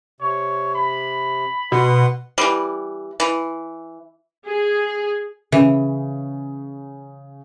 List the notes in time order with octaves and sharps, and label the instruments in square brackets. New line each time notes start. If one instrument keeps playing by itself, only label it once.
[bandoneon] C3 [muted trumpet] C#5
[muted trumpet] B5
[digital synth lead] B2 [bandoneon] B4 F#5 C6
[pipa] E3 G3
E3
[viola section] G#4
[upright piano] C#3 [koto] E3